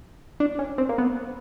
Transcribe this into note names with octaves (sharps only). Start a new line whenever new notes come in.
D4
C#4
C4
A#3
B3